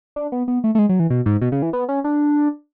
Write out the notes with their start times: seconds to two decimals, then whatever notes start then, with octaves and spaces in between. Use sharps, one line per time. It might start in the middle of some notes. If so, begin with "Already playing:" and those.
0.16 D4
0.32 B3
0.48 B3
0.64 A3
0.75 A3
0.79 G#3
0.89 F#3
1.00 E3
1.10 B2
1.26 G#2
1.41 B2
1.52 C#3
1.62 E3
1.73 B3
1.89 C#4
2.04 D4